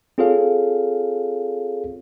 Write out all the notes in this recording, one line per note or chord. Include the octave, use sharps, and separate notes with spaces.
C4 F4 G#4 A4 C#5 F5